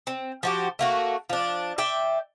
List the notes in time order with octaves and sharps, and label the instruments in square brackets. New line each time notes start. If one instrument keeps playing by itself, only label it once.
[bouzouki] C4
F3 F#4 G4
A3 A#3 F#4
F3 D4
D5 E5 G5